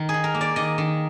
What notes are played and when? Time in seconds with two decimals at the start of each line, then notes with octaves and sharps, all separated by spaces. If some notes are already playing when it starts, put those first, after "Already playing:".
Already playing: D#3
0.09 G#4
0.14 D#4
0.24 A#4
0.34 A#3
0.41 D5
0.56 D#3 D#5
0.78 D#3